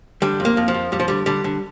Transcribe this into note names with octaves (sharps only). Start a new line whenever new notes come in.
D3 G3
F2
A#3
F2
F3
F2
F2 G3
F3
D3 G3
D3 G3
D3